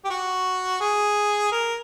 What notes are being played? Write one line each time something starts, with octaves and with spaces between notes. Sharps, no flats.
G4
F#4
G#4
A#4